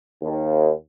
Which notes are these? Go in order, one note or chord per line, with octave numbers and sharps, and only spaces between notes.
D#2